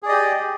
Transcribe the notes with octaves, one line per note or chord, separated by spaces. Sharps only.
G4 G#4 D5 D#5